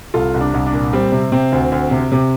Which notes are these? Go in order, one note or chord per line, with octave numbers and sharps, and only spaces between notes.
C2 F4 A4
C2
D4
C2
D4
A#2
G3 C4
C3
C3 C4
D2
D2
C3
C3